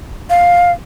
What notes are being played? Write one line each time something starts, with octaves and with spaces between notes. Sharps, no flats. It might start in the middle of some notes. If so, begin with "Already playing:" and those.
F5